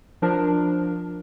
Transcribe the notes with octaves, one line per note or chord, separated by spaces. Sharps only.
F3 D4 A#4